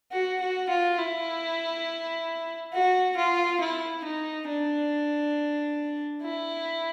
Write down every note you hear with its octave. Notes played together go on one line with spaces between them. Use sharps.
F#4
F#4
F4
E4
F#4
F4
E4
D#4
D4
E4